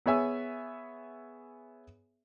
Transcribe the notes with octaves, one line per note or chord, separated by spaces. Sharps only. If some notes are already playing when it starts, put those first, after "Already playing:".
B3 G#4 C#5 E5 G#5 E6